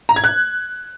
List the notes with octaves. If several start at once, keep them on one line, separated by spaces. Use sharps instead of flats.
A#5
G#6
F#6